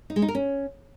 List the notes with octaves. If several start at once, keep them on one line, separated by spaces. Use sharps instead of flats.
D#4
G#3
D#4
A#4
C#4